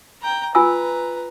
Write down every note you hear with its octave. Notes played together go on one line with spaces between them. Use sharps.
G5 A#5
F4 B4 G#5 A#5 E6